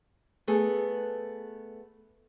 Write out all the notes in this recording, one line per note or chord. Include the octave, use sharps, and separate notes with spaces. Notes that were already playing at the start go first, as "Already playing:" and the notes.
A3 B3 G#4 A4